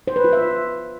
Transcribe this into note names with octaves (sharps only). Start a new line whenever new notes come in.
C5
B4
F4
E5